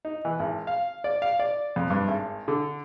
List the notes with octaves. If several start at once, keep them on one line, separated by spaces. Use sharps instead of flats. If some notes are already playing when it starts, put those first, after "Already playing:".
D#4
E3
G#1
F5
D5
F5
D5
F2
G2
G#1
D3